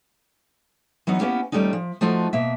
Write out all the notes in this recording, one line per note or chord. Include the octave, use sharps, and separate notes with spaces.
E3 F#3 B3 D#4
A#3 B3 C#4 E4 G4 A#4
D#2 F3 G3 A3 C#4 D#4
F3
F3 A3 D#4 F4 F#4
B2 A#3 E5